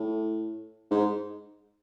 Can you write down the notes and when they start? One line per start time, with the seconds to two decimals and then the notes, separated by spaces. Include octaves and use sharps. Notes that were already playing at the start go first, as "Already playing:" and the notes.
Already playing: A2
0.91 G#2